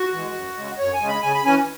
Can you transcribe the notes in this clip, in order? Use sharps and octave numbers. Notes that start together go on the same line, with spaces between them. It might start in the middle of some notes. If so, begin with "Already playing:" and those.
Already playing: F#4
E3 G#3
F#2
C#3 G#3
F#2 C#5
G#5
C#3 G#3
B5
C#3 G#5
B5
E3 C#4 G#5